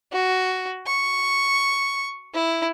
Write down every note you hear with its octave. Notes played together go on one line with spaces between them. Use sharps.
F#4
C#6
E4